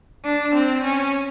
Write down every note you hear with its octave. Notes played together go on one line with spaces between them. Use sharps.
D4
C4
C#4